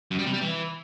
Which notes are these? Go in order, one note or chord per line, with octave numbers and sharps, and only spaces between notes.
F#2
G3
C3
G3
E3